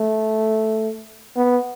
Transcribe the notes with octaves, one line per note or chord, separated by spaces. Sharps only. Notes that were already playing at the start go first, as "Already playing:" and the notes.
Already playing: A3
B3